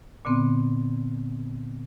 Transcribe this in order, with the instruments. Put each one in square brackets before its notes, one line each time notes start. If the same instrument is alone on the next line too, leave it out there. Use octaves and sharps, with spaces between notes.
[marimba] A#2 D3 B3 C4